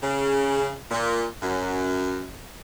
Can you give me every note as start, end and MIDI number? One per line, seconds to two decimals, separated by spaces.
0.03 0.75 49
0.91 1.24 46
1.41 2.28 42